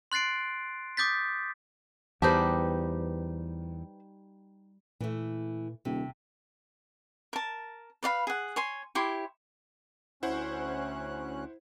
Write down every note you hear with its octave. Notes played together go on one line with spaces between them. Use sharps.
C6 F#6 A6 C7 D7
D6 D#6 G6 A6 B6
E2 G3 D#4 G4 B4 C5 A5
A#2 E3 A3
D#1 C3
A#4 A5
B4 D5 F5 B5
G#4 F#5
C#5 G#5 C6
E4 G4 C#5 C6
D2 C#4 E4 C5 F#5 F#6